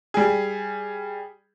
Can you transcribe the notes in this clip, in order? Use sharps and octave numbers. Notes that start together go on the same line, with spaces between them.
G3 G#4